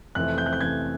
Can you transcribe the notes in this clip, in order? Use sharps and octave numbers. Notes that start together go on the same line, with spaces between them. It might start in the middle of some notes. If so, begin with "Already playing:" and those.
F2 C3 E3 A3 F#6
G6
F#6
G6
F2 C3 E3 A3 G#6